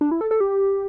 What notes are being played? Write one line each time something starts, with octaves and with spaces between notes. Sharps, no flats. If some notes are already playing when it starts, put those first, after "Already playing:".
D4
E4
A4
A4
G4